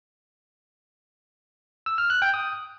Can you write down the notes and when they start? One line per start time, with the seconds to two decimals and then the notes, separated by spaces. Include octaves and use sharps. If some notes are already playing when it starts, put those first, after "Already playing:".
1.86 E6
1.98 F6
2.10 F#6
2.22 G5
2.34 D#6